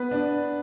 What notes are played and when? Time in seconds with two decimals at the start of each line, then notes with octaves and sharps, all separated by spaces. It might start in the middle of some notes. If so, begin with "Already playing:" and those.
Already playing: B3 B4
0.11 D4